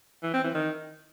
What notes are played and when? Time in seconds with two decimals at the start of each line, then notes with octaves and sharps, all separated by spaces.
0.23 E3
0.33 C4
0.44 E3
0.54 D#3